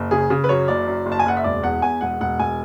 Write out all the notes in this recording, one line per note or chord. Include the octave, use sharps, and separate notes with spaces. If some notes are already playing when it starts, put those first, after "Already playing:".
Already playing: F#1
C#3 G#4
C#3
B4
F#2 C#5
F#1 D5
F#2
F#1
A5
G#5
F#1 F#5
E5
E1 D5
E2 F#5
E2 G#5
E1 F#5
E1 F#5
E1 G#5